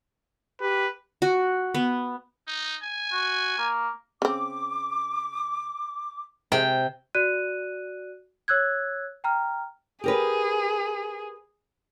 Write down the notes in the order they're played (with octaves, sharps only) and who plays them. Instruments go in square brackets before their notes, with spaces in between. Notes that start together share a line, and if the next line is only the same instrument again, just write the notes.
[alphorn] G4 [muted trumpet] B4
[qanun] F#4
B3
[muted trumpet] D#4
G#5
[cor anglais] F#4
A#3
[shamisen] C#3 C4 [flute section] D6
[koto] C3 G5 [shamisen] G#3
[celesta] F#4 D5 F#6 D#7
C#5 E6 F#6 G#6
G5 A#5 F6
[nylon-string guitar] G4 A#4 B4 [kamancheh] G#4